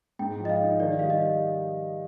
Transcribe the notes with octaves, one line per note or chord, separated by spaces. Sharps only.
G#2 G5
F3
D#5
F5
D#4
D#3 D5
G3 F5
D#5